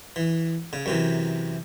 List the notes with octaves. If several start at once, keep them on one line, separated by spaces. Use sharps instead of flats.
E3
C#3
F#2 C3 E3